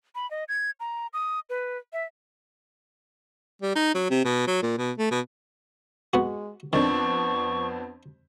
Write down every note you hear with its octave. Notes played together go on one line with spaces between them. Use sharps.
B5
D#5
G#6
A#5
D#6
B4
E5
G3
D#4
F#3
C3
B2
F#3
A#2
B2
A3
B2
G#3 B3 F#4
F2 D#3 B3 C4 D4 C#6